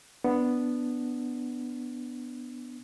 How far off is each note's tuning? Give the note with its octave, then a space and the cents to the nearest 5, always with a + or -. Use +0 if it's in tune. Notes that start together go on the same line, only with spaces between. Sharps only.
B3 +0 D4 +0